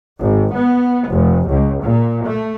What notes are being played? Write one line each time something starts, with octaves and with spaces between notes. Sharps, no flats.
G#1
B3
F1
C#2
A#2
A3